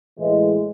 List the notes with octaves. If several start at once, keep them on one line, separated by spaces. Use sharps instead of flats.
A2 E3 G#3